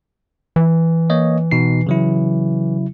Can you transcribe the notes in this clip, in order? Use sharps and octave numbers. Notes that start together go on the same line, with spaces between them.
E3
A#3 C#5 D#5
B2 D#4 C7
C#3 F#3 E4